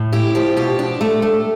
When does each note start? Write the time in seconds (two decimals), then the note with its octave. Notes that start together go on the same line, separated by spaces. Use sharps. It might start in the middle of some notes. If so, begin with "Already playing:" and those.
Already playing: A2
0.13 E4 G4
0.35 F3 G4
0.57 B2 G4
0.79 D4
1.01 A3
1.22 A3